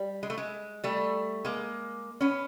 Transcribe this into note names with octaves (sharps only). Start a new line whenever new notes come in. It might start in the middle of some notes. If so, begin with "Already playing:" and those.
Already playing: G3
G#3
A3
G#3
G3 A3
G#3 A#3
B3 C#4